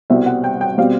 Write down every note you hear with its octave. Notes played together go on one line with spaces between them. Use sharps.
C2 B2 G3 C4 E5
F#5
G5
G5
B2 G3 C4 F5